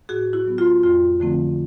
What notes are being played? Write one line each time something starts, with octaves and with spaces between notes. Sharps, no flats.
A2 F#4 G#4
E4 F#4
F#3 B3
F4
F2 F4
D3 F3 A3 C4